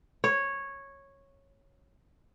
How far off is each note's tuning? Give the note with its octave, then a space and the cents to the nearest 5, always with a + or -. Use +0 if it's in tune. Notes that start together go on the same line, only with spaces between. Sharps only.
C#5 -10